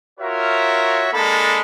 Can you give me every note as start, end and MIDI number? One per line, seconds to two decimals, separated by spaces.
0.20 1.09 65
0.20 1.09 66
0.20 1.09 70
0.20 1.09 73
0.20 1.09 76
1.13 1.61 56
1.13 1.61 58
1.13 1.61 62
1.13 1.61 69
1.13 1.61 83